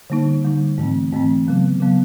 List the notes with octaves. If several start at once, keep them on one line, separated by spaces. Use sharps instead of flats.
D3 G3 A#3 D#4
D3 G3 A#3 D#4
G#2 E3 A3 C4
G#2 E3 A3 C4
C#3 F#3 B3
C#3 F#3 B3